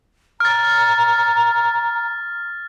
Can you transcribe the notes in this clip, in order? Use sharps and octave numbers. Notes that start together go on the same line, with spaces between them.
A#5 F6 A6